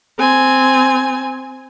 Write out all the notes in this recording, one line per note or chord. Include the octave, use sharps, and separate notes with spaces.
C4 G#5